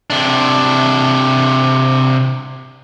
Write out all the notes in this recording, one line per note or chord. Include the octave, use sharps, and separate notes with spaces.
C3 D4